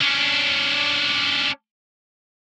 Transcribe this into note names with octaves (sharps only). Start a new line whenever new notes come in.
C#4 D4